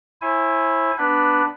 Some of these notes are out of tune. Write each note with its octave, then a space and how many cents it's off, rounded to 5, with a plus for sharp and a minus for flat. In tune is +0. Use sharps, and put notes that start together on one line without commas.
E4 +0 C5 +45 G#5 +0
B3 +0 D4 +0 B4 +0